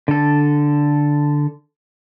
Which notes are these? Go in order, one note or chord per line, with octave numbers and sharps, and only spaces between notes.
D3 A4